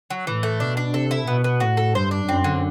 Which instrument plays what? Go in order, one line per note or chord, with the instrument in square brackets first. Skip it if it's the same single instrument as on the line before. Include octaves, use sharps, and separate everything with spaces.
[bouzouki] F#3
[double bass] A2 [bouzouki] E3
[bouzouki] A3
[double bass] B2 [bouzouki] D4
[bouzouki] D4
[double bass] C3 [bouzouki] A4
[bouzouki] E4
[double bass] B2 [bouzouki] B3
[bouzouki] B3
[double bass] A2 [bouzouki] F#4
[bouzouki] A4
[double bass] G2 [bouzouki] C5
[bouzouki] D4
[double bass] F#2 [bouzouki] C4
[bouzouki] D3